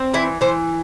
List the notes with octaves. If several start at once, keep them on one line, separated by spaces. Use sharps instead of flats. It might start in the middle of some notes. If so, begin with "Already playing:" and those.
Already playing: C4
E3 E4
E3 C5